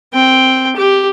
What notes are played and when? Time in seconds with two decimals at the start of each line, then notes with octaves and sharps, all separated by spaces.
0.14 C4 G5
0.76 G4